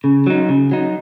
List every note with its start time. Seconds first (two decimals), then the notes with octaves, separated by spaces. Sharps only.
0.04 C#3
0.27 F#3 D#4
0.49 C#3
0.72 F#3 D#4